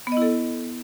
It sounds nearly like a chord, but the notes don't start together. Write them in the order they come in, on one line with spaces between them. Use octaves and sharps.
B3 D#5 E4 A4